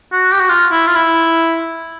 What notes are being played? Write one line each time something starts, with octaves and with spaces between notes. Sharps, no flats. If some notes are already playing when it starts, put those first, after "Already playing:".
F#4
G4
F#4
F4
E4
F4
E4